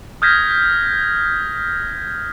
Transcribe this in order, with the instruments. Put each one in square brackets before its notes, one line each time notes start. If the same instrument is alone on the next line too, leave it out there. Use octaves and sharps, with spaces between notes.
[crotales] D#6 F6 G6 G#6 A#6 B6